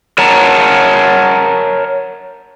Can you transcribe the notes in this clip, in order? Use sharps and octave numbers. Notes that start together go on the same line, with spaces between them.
A#4 C#5 F#5 A5 A#5